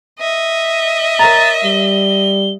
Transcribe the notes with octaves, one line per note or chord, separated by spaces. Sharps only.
D#5 E5
A#4 C#5 A#5 A6
G3 G7